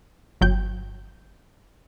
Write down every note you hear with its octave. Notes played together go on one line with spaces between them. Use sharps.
G1 F#3 G5 G6